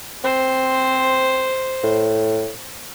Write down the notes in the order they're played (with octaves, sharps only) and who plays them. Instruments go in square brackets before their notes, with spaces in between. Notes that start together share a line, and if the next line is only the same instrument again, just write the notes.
[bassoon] C4 [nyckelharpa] C5
[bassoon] A2